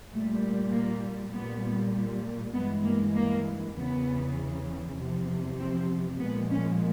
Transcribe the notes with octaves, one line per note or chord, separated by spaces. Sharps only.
A#2 G3 A3
A#3
A#2 G3 B3
G2 E3 G#3 B3
A#3
A#3
E2 C#3 E3 B3
E2 C3 F3
C4
A#2 F3 G#3 B3
C#4